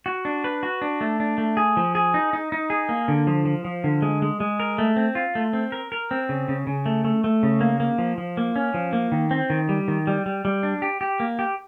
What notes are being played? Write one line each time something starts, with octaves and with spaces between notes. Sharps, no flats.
F#4
D4
B4
F#4
D4
A3
D4
A3
G#4
F3
G#4
D#4
D#4
D#4
G#4
A#3
D3
F3
F3
F3
D3
G#3
G#3
G#3
A#4
A3
C4
F4
A3
C4
A#4
A#4
C4
C#3
C#3
C#3
A3
A3
A3
C#3
A#3
A#3
F3
F3
A#3
C#4
F3
A#3
D#3
C4
D#3
G3
D#3
G3
G3
G3
D4
G4
G4
A#3
G4